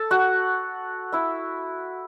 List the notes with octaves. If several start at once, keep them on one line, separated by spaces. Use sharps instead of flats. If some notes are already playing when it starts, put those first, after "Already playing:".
Already playing: A4 A5
F#4 F#5
E4 E5